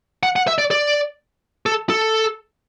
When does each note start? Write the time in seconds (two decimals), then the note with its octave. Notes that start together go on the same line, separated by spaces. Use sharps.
0.23 F#5
0.36 F#5
0.47 E5
0.58 D5
0.71 D5
1.66 A4
1.90 A4